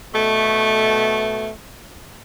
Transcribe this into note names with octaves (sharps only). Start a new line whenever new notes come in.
B2 A3